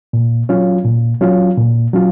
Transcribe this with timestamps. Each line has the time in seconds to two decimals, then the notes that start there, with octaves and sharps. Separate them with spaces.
0.13 A#2
0.49 F#3 C#4 F4
0.84 A#2
1.21 F#3 C#4 F4
1.58 A#2
1.93 F#3 C#4 F4